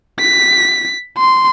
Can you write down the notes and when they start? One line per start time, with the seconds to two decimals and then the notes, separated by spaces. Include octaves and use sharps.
0.20 B6
1.17 C6